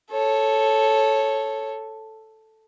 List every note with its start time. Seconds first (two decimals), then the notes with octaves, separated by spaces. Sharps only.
0.11 A4 C#5